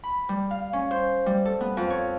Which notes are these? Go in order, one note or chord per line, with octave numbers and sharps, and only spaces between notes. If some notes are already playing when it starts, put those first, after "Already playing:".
B5
G3
F5
C#4
C5
G3
A4
B3
F2
C#5